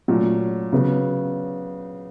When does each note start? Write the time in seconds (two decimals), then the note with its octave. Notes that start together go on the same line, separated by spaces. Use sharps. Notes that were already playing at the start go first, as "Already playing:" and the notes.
0.08 A#2 F#3 A3 C#4
0.73 C#3 F#3 B3